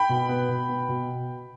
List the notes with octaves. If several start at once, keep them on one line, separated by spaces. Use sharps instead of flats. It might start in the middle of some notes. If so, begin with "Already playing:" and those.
Already playing: G5 B5
B2
B3
B2
B3
B2